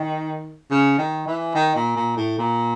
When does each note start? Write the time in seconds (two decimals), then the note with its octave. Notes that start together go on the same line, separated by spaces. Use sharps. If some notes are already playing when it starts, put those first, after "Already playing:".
Already playing: D#3
0.71 C#3
0.98 D#3
1.26 E3
1.55 D#3
1.75 A#2
1.96 A#2
2.17 A2
2.38 A#2